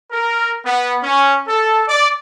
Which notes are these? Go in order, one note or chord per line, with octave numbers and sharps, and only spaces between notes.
A#4
B3
C#4
A4
D5